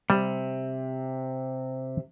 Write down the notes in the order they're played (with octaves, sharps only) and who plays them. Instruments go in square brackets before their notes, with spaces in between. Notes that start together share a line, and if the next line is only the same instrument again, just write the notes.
[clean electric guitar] C3 [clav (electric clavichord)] G3